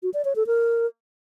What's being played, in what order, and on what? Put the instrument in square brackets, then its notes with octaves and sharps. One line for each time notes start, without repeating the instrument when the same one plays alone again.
[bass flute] F#4
D5
C#5
A4
A#4